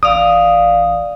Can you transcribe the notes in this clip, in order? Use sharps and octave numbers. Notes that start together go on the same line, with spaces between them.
A1 D5 F5 D#6